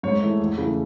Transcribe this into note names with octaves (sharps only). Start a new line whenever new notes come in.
G#2 C#5
E3 A3
E2
C#3 E3 A3